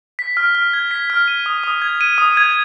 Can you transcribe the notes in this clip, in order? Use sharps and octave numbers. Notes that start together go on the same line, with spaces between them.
B6
F6
F6
G#6
B6
F6
D#7
D#6
D#6
G#6
D#7
D#6
G#6